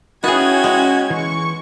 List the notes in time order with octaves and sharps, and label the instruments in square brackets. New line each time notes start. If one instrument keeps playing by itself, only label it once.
[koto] B3 G#4 [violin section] C#4 G5 G#6 [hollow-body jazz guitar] D#4 E4 [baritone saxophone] F#4
[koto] G#3
[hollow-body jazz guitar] E3 [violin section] C#6